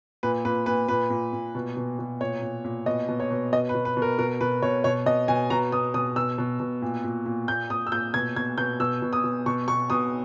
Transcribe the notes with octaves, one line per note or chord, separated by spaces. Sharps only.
A#2 B4
A#2 B4
A#2 B4
A#2 B4
A#2
A#2
B2
B2
B2
A#2 C#5
A#2
A#2
B2 D#5
B2
C#5
B2
B2 D#5
B4
B2
B4
B2
A#4
B2 A#4
B2 B4
B2 C#5
B2 C#5
B2 D#5
B2 G#5
B2 A#5
B2 D#6
B2 D#6
B2 E6
B2
B2
A#2
A#2
A#2
A#2 G6
A#2 D#6
E6
A#2 G6
B2 G#6
B2 G#6
B2 G6
B2 E6
B2
D#6
B2
B2 C#6
B2 C#6
B2 D#6